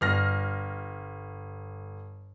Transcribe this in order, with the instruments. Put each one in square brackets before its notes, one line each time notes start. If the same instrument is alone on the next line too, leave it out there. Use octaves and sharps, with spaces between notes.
[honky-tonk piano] G1 F6 A#6